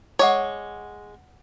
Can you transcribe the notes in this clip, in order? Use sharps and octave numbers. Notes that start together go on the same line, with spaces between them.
G#3 C#5 F#5 D6